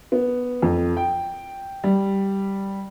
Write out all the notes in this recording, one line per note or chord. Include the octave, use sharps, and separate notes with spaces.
B3
F2
G5
G3